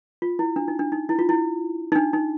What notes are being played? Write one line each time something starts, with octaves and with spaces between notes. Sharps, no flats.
F4
E4
D4
D#4
D4
D#4
E4
F4
E4
D#4
D4
D#4